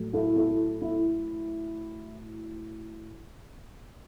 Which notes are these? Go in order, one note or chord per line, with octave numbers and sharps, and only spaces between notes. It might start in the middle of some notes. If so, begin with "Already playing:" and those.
Already playing: A2 F#3 A3
E4 A4
E4 A4
E4